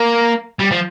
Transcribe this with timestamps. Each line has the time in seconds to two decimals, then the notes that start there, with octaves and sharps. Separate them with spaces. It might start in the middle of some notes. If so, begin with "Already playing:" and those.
Already playing: A#3
0.59 G3
0.71 F3